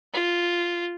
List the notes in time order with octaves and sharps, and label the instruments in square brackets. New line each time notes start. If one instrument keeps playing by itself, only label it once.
[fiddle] F4